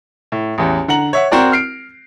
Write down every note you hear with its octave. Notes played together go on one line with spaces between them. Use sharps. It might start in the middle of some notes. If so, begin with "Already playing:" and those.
A2
A1 E2
D3 F#5 A#5 F#7
C#5 E5 F#5
C4 F#4 A#4 D5
F6 C7 D7